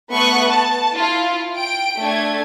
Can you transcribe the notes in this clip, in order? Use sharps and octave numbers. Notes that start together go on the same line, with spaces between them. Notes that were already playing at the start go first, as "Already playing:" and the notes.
A3 B3 C#6 D#6 F#6
A5
E4 F4
G5 D7
A3 D4 G#6